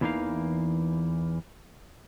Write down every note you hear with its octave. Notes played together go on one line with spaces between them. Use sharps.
E2 E3 G#3 A#3 D#4 F5